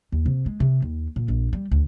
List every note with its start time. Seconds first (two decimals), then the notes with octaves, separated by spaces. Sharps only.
0.12 D#2
0.26 C3
0.46 G#3
0.60 C3
0.82 D#2
1.16 A#2
1.28 A#1
1.53 G3
1.71 D2